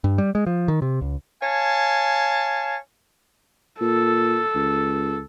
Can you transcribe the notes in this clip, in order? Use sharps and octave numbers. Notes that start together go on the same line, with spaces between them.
G2
G3
G#3
F3
D#3
C3
C#2
C#5 F5 G#5 A5
A#2 A4
C#2